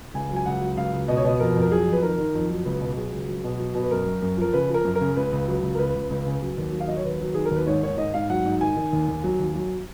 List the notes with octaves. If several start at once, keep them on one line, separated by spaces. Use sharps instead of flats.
C#2 G#5
F#3
G#5
C#2 F#5
F#3
C#2 F5
C#2
B2 D#5
C#5
B2 D#5
F2 A#4
F2
A#4
F#3 G#4
F2
B4
D#3 A#4
D#3
F2
F#3
C#2 B4
B2
F#3 G#4
C#2
F#3
B2
F#3
B2
B4
F#2 A#4
F#2
F#2
F3 A#4
C#3 B4
F3 A#4
F#2
A#4
C#3
C#2 B4
C#2
F#3
C#2
A#4
C#2 B4
C#2
C#2
C#3
F#3
D#2
F#3
F5
F#3 D#5
C#5
D#2 B4
F#3
D#3 G#4
A#4
D#2
B4
G#2 C#5
D#3 C#5
G#2 D#5
G#2 F5
F#3 F#5
G#2
D#3 G#5
D#3
D#2
D#2
F#3
D#2
F#3